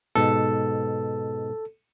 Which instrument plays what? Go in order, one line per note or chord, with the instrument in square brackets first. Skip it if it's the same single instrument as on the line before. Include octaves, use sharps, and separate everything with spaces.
[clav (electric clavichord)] G#2 B2 [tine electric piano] A4